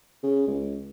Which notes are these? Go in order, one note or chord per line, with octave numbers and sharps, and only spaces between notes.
C#3
C#2